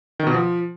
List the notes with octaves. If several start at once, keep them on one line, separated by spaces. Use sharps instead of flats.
D#3
B2
F3